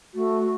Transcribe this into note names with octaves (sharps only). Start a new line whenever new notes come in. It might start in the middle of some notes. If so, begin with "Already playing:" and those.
A3 F#4